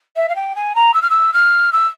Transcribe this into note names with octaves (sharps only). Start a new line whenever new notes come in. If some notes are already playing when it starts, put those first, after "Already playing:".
E5
F5
G5
G#5
A#5
E6
F6
E6
F6
E6